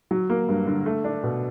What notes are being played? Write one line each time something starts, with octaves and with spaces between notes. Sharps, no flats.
F#3
A#3
G2
D3
A3
D4
B2